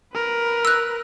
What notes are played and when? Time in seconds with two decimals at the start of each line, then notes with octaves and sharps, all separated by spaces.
0.14 A#4 B4
0.65 E6 F#6